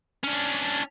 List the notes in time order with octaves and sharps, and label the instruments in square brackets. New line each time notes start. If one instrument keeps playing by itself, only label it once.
[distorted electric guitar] C#4 D4